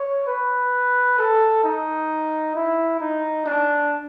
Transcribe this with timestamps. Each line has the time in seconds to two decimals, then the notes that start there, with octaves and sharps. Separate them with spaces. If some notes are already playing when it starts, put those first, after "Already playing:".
Already playing: C#5
0.27 B4
1.18 A4
1.64 D#4
2.55 E4
3.01 D#4
3.46 D4